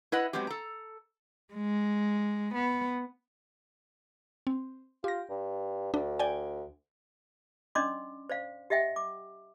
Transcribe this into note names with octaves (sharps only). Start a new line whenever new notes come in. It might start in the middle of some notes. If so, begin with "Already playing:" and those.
E4 B4 D#5 F#5
F#3 G#3 B3 C4 G4
A4 A#5
G#3
B3
C4
F4 G4 A#6
G2
D2 D4
D5 G5 G#5
C#4 D4 D5 D#5 C6 D6
C5 D5 F5
G4 D#5 E5 F#5 G5
D6